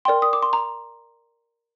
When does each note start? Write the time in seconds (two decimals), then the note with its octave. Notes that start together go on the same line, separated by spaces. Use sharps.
0.05 A#4 D5 G5 C6
0.22 D#6
0.33 D6
0.43 C6
0.53 A#5